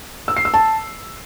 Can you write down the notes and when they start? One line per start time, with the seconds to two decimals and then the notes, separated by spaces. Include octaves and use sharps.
0.28 E6
0.37 C7
0.45 E6
0.54 A5